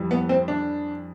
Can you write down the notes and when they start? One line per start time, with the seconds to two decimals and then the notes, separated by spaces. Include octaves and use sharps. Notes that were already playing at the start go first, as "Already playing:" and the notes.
Already playing: F2 E3 G3
0.11 B3
0.29 C4
0.48 D4